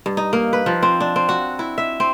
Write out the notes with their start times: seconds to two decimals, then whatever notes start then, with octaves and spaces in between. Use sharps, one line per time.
0.06 G2
0.17 D#4
0.33 A#3
0.53 B4
0.66 F3
0.83 C4
1.00 D4
1.16 C4
1.29 F#4
1.59 E4
1.78 E5
2.00 C4